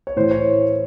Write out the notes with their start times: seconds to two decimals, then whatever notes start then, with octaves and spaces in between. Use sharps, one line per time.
0.07 C#5
0.16 A2 E3 C5
0.31 C#5